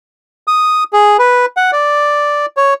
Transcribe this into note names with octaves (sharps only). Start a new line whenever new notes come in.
D#6
G#4
B4
F#5
D5
C#5